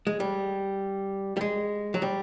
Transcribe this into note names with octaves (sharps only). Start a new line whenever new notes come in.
G#3
G3
G3
G#3
F#3
G3